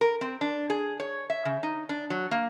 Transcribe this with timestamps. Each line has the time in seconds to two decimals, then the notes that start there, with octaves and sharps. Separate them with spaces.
0.01 A#4
0.21 C4
0.41 D4
0.70 G#4
1.00 C#5
1.30 E5
1.45 C#3
1.63 D#4
1.89 D4
2.10 F#3
2.31 A#3